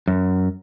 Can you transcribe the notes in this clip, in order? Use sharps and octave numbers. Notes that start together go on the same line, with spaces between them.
F#2